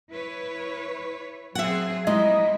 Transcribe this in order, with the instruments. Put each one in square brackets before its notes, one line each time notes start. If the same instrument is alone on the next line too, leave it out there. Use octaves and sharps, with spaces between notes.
[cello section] E4 B4 C#5
[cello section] F#3 C4 G#4 [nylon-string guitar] E5 F#5
[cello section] F3 G3 E4 [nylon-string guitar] G#3 D#4 [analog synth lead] D#5